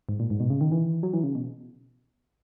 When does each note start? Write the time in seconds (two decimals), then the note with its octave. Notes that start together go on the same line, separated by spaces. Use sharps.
0.09 G#2
0.20 A#2
0.30 G#2
0.40 B2
0.50 C#3
0.61 D#3
0.72 E3
1.03 F#3
1.13 E3
1.23 C#3
1.35 B2